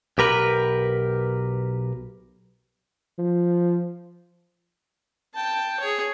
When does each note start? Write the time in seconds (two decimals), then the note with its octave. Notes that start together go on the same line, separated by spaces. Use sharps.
0.18 B1 G4 A#4 B4
3.19 F3
5.34 G5 A5
5.80 G#4 C#5